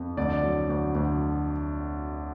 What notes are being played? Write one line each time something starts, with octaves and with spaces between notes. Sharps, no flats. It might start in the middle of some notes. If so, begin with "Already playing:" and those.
Already playing: F2
D2 D5
F#3
D2
D2